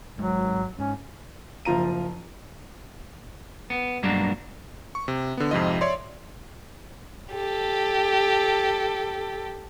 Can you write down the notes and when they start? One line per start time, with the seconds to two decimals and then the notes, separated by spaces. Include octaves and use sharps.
0.18 G#1 F#3 G#3
0.79 G#2 C#4
1.65 F#1 F3 F4 A#5 D#7
3.70 B3
4.03 G2 B2 F#3 G#3 A#3 D4
4.95 C#6
5.08 C3
5.37 D3 B3
5.51 F2 G#2 C3 F3 F4 D#5
5.81 C#5 D5 E5 C6
7.32 G4 A4